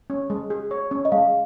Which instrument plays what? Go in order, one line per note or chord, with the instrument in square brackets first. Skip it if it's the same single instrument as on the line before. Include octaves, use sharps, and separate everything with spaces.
[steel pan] C#4
G#3
G#4
C#5
C#4
[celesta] D#5
[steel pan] G#3 [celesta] F5